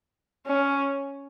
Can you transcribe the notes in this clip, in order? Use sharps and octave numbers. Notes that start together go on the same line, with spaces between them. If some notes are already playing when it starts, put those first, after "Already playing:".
C#4